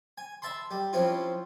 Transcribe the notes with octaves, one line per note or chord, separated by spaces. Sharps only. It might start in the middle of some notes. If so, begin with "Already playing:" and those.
G#5
E5 A5 B5 C6
G3
F3 C4 C#4 E4 F4